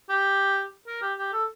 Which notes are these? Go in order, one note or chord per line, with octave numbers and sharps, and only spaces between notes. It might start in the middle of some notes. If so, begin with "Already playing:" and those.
G4
A#4
G4
G4
A4